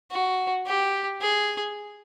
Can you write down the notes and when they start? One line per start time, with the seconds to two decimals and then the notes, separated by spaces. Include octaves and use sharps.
0.11 F#4
0.67 G4
1.21 G#4